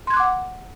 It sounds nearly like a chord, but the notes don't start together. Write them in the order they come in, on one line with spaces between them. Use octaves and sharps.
C6 G#6 F#6 D6 F#5